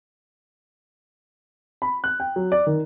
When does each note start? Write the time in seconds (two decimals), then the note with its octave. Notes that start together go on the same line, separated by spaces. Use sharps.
1.82 B5
2.04 F#6
2.20 G5
2.36 F#3
2.52 D5
2.67 D#3